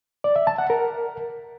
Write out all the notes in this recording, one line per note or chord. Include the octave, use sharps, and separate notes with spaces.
D5
E5
A5
F#5
A#4